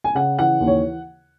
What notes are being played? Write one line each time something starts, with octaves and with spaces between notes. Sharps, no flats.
G#5
C#3 F#5
E3 F#5
D#2
C#5